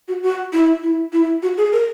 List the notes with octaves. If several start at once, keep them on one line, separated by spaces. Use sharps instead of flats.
F#4
F#4
E4
E4
E4
F#4
G#4
A#4